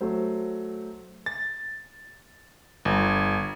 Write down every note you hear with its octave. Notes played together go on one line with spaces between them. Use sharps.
F#3 A3 C5
A6
G1